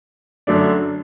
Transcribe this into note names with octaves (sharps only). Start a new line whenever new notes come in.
F#2 D3 F#3 A3 D4